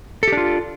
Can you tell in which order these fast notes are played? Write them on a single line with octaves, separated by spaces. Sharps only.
A4 G4 D4 F4